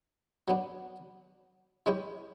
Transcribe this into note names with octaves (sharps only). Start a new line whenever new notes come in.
F#3 B3 D4
E3 G#3 C#4 E4 G4